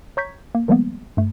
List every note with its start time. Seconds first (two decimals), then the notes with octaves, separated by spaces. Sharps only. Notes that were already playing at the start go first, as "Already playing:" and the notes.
0.17 C#5 A#5 C#6 G6 G#6 B6
0.55 A#3
0.68 D#3 F3 G3 G#3 A#3 B3
1.17 G2 A3